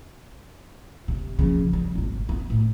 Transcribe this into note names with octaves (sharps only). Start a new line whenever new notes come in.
C3
C#3 F3
G3
G#1 C3
B3
A2 A3